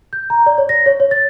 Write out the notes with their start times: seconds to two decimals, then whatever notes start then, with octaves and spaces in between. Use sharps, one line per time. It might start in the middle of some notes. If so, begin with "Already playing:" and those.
0.13 G6
0.30 A#5
0.46 D5
0.58 C#5
0.69 A#6
0.86 C#5
1.00 C#5
1.11 A6